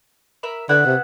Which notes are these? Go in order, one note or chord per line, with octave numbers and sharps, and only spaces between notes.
A#4 E5 B5
D3 B3 E4 F#5
C3